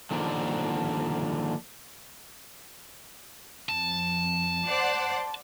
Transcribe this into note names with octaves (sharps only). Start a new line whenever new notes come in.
D3 D#3 F3 A#3 D4
F2 A5
C5 D5 F#5